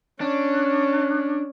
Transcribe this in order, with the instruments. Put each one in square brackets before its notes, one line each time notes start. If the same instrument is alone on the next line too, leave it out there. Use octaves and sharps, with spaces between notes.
[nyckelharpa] C#4 [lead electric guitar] D4